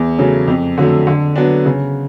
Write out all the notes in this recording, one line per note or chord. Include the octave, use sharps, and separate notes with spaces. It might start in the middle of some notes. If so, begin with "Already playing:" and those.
Already playing: E2
C#3 F#3 A3
F2
D3 F#3 A3
D3
F#3 B3 D4
C#3